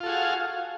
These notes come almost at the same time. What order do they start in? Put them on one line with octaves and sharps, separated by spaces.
F4 A4 F#4 G#4 F5